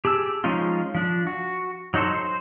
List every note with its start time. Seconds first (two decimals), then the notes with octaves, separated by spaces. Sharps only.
0.05 G4 G#4 A5 E6
0.44 F3 G#3 C#4 D#4 F4
0.95 F3 D4
1.27 F#4
1.94 F#3 D#4 F#4 A4 C5
2.14 C5